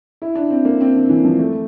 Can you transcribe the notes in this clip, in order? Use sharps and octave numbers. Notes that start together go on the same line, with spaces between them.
E4
D4
C4
A#3
C4
D3
E3
F3
A3